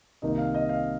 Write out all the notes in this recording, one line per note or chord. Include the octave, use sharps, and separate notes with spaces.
C2 C3 D#3 A#3 D#4 D#5
F5
D#5
F5